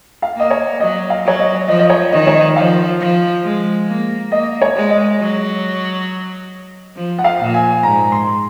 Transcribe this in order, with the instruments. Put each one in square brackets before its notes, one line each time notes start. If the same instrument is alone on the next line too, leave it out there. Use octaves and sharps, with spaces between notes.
[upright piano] F5
[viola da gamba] A#3 [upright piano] D#5
[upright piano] C#5
[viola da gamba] F#3 [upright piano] D#5
[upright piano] F5
[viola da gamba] F#3 [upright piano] C#5
[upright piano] D#5
[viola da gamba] F3 [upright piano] D#5
[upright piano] D#5
C#5
[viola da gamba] D#3 [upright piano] D#5
[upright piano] C#5
D#5
[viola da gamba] F3 [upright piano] F5
[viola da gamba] F3
G#3
A#3
[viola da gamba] A#3 [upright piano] D#5
[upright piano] C#5
[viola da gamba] G#3
[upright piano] D#5
[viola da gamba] F#3
F3
[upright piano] F#5
F5
[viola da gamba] A#2
[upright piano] G#5
[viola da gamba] G#2 [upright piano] A#5
[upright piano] C6